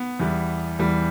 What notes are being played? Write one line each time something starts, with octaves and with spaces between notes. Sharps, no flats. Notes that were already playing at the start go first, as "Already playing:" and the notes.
Already playing: B3
E2 E3 G3
E2 E3 G3